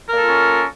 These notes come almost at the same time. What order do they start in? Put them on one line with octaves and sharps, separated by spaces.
A#4 A#3 A4 F4 C#4